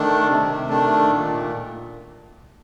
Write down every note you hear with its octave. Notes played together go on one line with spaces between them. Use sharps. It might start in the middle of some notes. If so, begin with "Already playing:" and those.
Already playing: D#3 A3 D4
C3
D#3 A3 D4
A#2